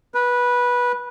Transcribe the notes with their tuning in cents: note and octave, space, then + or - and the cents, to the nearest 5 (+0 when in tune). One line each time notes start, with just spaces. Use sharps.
B4 -15